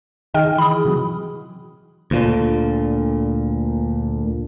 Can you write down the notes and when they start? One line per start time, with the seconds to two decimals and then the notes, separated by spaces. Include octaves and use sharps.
0.34 D#3 G#4 D#5 G5 F6
0.58 E3 B5 D#6
0.85 C3 E3 F#3
2.11 D2 A#2 D3